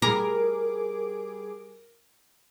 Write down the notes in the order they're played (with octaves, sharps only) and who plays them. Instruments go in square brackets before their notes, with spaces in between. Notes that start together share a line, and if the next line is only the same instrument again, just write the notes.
[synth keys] G3 G#4 D6 [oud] A#4